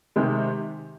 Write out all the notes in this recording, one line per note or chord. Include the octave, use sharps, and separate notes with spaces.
C3 D#3 G#3